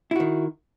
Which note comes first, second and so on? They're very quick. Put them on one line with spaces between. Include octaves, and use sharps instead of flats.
E4 F#4 D#3